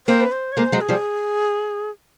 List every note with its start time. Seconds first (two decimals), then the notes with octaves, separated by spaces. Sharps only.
0.07 A#3 C4 C5
0.21 B4
0.32 C5
0.52 C#5
0.57 G#3 A#3 C5
0.72 F#3 G#3
0.81 G#4
0.89 F3 G3